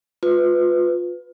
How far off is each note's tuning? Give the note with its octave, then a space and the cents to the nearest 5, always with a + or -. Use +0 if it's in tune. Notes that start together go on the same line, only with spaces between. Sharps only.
F4 +25 B4 +15